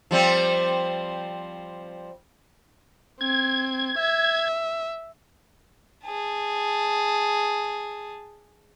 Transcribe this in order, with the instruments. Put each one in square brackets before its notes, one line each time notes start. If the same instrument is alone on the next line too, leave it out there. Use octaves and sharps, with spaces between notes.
[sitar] F3 G3 C4
[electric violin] C4 [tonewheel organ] G#6
[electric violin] E5
[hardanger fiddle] G#4 A5